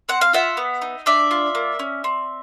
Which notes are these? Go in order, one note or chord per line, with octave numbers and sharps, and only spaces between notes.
C4 F#5
F5
F4 E5 F#5
B3
D#4
D4 D5 E5
F4
A#3
C#4
C4